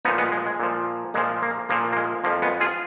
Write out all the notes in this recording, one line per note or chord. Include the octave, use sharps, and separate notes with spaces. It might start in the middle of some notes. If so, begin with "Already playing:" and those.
A#2 F3 B3 D#4
G#3 B3
G#3
G#3
A#2 F3
A#2 F3 G#3
A#3
A#2 F3 A#3
A#3
G#3
F2 F3 A#3
G#3 B3
F4 G#4